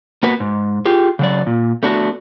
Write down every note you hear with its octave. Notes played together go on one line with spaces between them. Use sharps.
A#3 B3 F#4 B4
G#2
F4 G4 G#4
C#3 F#3 D5
A#2
A3 B3 D4 F4 F#4